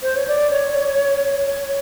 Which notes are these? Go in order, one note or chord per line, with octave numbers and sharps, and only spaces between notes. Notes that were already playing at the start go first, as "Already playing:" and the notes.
C5
C#5
D5
C#5
C#5